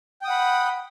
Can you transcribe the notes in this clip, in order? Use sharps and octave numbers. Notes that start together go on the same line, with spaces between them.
F#5 G5 B5 D#6